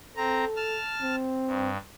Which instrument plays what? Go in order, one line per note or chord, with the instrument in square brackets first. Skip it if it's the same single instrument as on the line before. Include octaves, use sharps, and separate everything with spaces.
[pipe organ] C4 A#5 [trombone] A4
[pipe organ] A5 F6
[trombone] C4
[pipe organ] G2